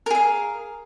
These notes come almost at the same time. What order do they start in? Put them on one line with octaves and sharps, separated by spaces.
A#4 G#4 F5